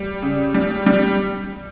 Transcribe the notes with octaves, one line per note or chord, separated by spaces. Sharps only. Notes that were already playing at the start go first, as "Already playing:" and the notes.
Already playing: G3
C#3
G3
G3